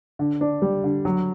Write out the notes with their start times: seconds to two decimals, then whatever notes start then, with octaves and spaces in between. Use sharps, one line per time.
0.19 D3
0.41 D4
0.62 G3
0.84 D3
1.05 F#3